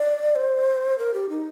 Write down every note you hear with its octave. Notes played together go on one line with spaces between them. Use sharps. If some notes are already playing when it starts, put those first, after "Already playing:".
Already playing: D5
C5
A#4
G4
D#4